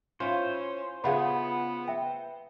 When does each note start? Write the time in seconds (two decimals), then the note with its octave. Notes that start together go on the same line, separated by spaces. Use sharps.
0.20 C#4 E4 F4 C5
1.04 C#3 B3 F4 G#4 E5 F#5 B5
1.88 E5 G5